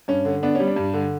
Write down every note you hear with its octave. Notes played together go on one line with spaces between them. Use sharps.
G2 C#4
D3
B3 D4
G3 C#4
D4
G2
D3